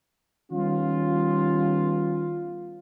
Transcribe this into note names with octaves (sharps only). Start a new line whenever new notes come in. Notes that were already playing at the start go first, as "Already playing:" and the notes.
D#3 G3 B3 C#4 F4